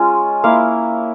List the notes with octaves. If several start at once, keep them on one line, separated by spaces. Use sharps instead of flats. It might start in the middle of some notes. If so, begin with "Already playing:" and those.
Already playing: G#3 C#4 F4
A#3 E4 F5